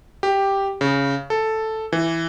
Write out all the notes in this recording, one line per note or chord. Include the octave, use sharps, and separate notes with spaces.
G4
C#3
A4
E3